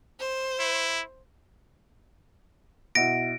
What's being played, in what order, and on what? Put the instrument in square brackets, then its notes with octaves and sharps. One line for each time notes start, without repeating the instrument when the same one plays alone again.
[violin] C5
[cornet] E4
[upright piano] B2 E4 [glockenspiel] A#6 D7